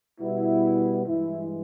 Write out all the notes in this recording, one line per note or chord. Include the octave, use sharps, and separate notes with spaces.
B2 G3 B3 E4
G2 E3 G#3 E4